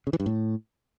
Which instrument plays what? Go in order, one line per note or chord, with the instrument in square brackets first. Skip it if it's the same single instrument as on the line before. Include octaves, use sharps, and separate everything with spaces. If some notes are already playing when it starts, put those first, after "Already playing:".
[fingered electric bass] C#3
E3
G2
A2